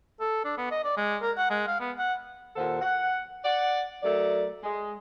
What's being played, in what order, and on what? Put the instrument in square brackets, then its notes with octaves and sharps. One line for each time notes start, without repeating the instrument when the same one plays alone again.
[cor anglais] A4
D4
B3
D#5
D5
G#3
A#4
F#5
G#3
F5
B3
F#5
[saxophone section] D#2 A#2 A4 C5 F#5
F#5
D5 F#5
F#3 A3 A#4 D5
G#3